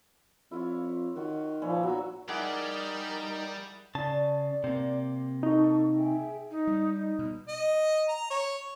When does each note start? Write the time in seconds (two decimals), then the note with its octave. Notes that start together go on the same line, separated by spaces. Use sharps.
0.51 F2 E4 F4 C#5
1.16 D#3 F4 F#4
1.62 A#2 E3 F3 C#5
1.83 B1 F#3 F#4
2.29 G3 D#4 E4 G#4 A#4 D5 F#5 G5
3.95 C#3 D5 A5
4.64 C3 A#3
5.43 D#4 A4 C#6
5.96 G#4 E5 G5
6.51 D#4
6.67 G3
6.94 D#4
7.19 B2
7.48 D#5
8.08 A#5
8.30 C#5